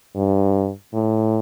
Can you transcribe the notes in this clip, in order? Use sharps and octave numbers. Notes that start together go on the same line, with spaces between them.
G2
A2